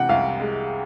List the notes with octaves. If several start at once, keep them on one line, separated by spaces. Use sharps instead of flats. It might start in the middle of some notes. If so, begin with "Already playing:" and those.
Already playing: C3 E3 F#5 G5
C2 F5
G#3